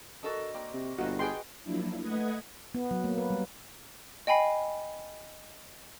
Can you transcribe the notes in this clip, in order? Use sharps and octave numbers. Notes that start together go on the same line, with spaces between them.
D4 F#4 A4 A#4 D#5
A#3 C4 A#4 D5
C3
G1 B2 D#3 A#3 F#4 D#5
G3 G#4 B4 F#5 G5 C6
F3 F#3 A#3 D4 E4
A3 B4 D#5 F#5 D#6 G#6
B3
F#3
A#3
B4
G3
D#5 G5 G#5 B5 C7